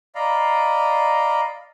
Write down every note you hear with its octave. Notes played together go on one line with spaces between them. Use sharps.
D5 D#5 F5 A#5 B5